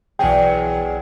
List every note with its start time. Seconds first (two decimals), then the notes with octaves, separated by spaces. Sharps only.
0.19 B1 E2 F#3 G#4 G5